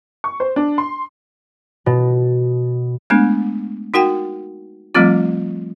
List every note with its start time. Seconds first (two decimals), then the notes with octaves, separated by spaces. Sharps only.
0.24 C#6
0.40 C5
0.56 D4
0.78 C6
1.86 B2
3.10 G#3 A3 B3 D4
3.94 D#4 F#4 A#4 F#5 G5
4.95 F3 G3 A3 C4 F4